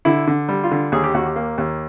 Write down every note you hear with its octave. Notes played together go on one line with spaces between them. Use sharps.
D3 E4
D3
G3
F4
D3
D#2 G#4
G4
D#2 F#4
G4
A#3
D#2